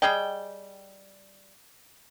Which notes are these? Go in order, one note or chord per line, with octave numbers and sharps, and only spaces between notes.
G3 G#4 D#5 G5